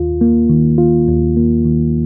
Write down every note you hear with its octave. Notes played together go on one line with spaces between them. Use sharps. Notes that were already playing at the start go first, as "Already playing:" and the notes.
Already playing: D#2 F4
A#3
D#3
F4
D#2
A#3
D#3